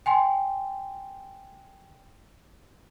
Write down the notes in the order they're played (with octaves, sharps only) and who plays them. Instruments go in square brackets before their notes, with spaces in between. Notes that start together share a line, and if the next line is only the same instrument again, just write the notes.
[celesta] G5 G#5 C6